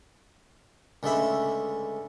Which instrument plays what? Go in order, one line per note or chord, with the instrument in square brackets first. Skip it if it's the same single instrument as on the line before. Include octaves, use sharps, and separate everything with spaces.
[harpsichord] C#2 D3 G#3 A3 E5 B5